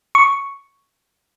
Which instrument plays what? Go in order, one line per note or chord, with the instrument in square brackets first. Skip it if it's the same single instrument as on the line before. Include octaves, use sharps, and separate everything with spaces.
[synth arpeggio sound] C#6